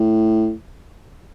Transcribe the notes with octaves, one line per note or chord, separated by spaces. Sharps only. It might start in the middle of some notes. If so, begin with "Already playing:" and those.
Already playing: A2